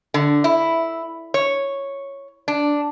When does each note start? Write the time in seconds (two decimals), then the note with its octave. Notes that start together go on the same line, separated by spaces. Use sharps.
0.14 D3
0.44 E4
1.34 C#5
2.48 D4